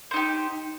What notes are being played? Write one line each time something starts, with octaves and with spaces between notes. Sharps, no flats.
D#4 G4 C5